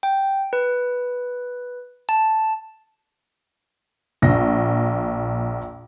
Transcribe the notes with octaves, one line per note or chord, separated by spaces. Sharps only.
G5
B4
A5
A#1 A#6